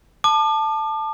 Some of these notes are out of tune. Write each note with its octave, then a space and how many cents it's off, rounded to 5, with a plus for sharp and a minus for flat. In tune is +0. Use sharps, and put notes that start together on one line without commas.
A5 +0 D6 +40